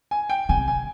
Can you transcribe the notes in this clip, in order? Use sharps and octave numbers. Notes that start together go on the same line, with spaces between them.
G#5
G5
C3 G#5
G#5